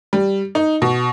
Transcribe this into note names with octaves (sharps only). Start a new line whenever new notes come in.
G3
D#4
B2